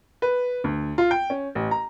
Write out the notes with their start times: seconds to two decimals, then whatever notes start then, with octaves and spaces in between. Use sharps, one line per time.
0.22 B4
0.64 D2
0.98 F4
1.11 G5
1.30 C#4
1.55 A1
1.71 A#5